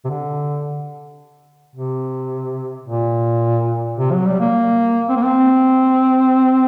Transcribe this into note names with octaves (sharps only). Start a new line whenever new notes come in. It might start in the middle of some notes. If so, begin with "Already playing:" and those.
C3
D3
C3
A#2
C3
F#3
G3
A#3
C4
A#3
C4